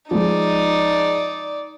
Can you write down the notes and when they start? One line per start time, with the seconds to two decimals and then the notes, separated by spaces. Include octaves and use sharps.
0.11 F3 G#3 D#4 D5